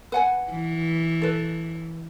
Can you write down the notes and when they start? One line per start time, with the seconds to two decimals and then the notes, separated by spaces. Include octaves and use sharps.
0.12 B4 F#5 G#5
0.50 E3
1.22 A4 B4